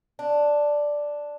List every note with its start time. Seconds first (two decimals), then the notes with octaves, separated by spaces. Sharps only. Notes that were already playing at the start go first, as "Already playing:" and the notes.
0.19 D4